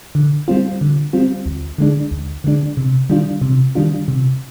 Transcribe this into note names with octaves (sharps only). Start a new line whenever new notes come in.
D3
G3 C4 F4
D3
G3 C4 F4
D2
D3 G#3 D4
D2
D3 G#3 D4
C3
D#3 G3 D4 F4
C3
D#3 G3 D4 F4
C3